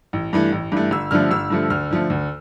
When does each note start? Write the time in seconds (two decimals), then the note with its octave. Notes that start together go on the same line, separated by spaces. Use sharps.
0.13 A1
0.33 G2 E3 A3
0.52 A1
0.72 G2 E3 A3
0.91 G1 E6
1.11 G2 D3 F3 A3 F6
1.31 G1 E6
1.50 G2 D3 F3 A3
1.70 D2 F6
1.91 D3 F3 A3
2.10 D2